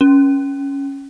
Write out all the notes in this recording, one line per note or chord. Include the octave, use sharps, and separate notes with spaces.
C#4